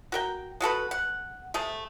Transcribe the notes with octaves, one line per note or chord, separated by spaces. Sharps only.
F#4 A#4 G5
G#3 F#4 A4 B4
F#5
C3 A3 G#4